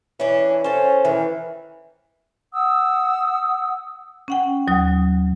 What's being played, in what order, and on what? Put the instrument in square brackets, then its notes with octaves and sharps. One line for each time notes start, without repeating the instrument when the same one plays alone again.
[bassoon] E3 [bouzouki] C#4 D4
[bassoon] C#4 [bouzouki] A4 C5
[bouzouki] D#3 [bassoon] E3
[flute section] F#5 D#6 E6
[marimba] C#4 F#5 G5
D#2 F#3 D#6